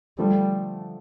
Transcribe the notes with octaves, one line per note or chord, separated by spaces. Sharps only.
D3 F3 G3 A3